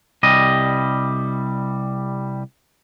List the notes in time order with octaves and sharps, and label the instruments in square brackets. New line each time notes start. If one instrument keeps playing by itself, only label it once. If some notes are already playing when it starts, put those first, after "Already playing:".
[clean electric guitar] C2 G3 D#5